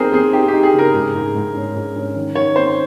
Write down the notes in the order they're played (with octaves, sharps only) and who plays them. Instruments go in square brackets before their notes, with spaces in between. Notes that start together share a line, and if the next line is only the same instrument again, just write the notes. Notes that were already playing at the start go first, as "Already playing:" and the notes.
Already playing: [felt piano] C4 D#4 [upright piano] G#4 A#4 C5
[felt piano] C4 [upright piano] G#4
[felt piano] D#4 [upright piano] G4
[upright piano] G4
[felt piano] D#4
[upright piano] G#4
[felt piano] C#3
[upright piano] A#4
[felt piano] G#2
G#2
G#2
C#4
G#2
C#4
D#3
[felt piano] D#3 [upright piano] C#5
[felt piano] C4 [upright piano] C5